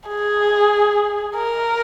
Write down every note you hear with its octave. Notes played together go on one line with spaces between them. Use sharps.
G#4
A#4